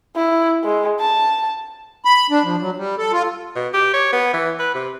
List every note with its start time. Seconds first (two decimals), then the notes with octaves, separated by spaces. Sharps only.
0.16 E4
0.64 G#3
1.00 A5
2.05 B5
2.30 D4
2.44 F3
2.61 F#3
2.77 G3
2.98 A4
3.12 F4
3.56 B2
3.74 G4
3.94 C#5
4.12 B3
4.33 E3
4.59 B4
4.75 C3